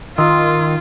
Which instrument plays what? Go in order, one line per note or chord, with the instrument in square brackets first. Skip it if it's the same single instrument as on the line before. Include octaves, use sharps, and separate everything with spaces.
[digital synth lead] D#3 [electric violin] F4 [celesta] C6 D#6 E6